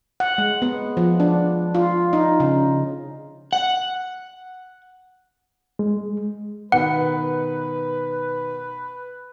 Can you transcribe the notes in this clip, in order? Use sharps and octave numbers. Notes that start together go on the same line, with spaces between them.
F#5
G#3
B3
F3
D4
F4
D#4
C#3
F#5
G#3
B2 D#3 B3 B4 F#5